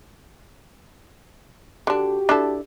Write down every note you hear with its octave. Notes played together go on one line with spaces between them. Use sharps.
D3 D4 F#4 G4
D4 E4 A4